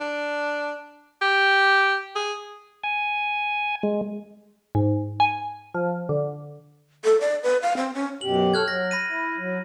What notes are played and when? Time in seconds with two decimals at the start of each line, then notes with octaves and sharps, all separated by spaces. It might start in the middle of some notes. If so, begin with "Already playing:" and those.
0.01 D4
1.22 G4
2.16 G#4
2.84 G#5
3.83 G#3
4.75 G#2
5.20 G#5
5.74 F3
6.09 D3
7.04 A4
7.21 D5
7.43 B4
7.62 F5
7.77 C4
7.94 C#4
8.21 F#2 B2 G4 F#7
8.54 A4 C#5 F6 F#6 G#6
8.68 F#3 A#6
8.91 B5 A#6 D#7
9.08 E4
9.38 F#3